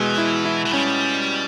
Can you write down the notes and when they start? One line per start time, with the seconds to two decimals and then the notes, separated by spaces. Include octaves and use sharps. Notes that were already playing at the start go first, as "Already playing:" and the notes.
Already playing: B2 E3 G#3
0.18 E4
0.45 E4
0.66 E3
0.72 G3 C#4